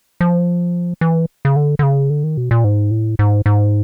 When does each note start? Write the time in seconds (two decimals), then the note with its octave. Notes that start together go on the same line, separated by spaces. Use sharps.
0.21 F3
1.01 E3
1.45 C#3
1.56 D3
1.79 D3
1.83 C#3
2.10 D3
2.24 D#3
2.37 B2
2.51 A#2
2.64 G#2
2.91 A2
3.19 G#2
3.46 G#2